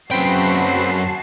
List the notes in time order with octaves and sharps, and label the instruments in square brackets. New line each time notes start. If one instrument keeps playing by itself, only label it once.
[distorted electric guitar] F#2 G5 [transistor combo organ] C4 B4 [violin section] F#4 A5 C7